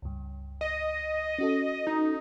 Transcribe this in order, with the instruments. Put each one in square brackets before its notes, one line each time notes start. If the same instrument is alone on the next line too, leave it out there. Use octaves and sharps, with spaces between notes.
[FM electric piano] C#2 G2
[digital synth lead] D#5
[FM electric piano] C#4 F#4 A4
[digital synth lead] D#4